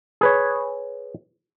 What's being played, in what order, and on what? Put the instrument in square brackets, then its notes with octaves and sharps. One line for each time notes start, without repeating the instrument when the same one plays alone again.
[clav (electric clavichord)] G#4 B4 C#5